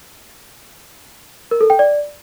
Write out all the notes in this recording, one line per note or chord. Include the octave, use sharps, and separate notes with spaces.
A#4
A4
G5
D5